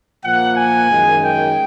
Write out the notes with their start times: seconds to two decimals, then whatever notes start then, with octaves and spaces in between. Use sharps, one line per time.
0.24 A#2 F3 A#3 F#5
0.57 G#5
0.89 F#2 D#3 G#3
1.23 G5